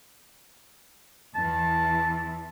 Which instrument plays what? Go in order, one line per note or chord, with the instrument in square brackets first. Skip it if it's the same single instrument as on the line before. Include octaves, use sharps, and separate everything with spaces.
[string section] E2 E3 [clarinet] A5